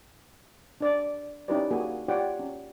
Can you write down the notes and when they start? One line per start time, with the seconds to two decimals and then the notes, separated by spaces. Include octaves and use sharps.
0.81 D4 D5
1.48 C#4 D#4 E4 G4 B4 D5
1.71 A#3 F#4 G#4 G#5
2.08 F4 G4 C#5 D5 F#5 G5
2.39 C#4